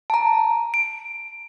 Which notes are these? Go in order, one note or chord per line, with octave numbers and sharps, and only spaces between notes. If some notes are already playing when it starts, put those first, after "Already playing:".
A5 A#5
D7